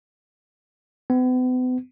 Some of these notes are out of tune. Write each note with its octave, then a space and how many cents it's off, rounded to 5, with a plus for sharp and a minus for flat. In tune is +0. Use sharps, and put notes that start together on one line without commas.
B3 +40